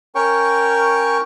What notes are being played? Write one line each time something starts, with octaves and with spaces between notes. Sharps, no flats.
C#4 A#4 C#5 G5 C#6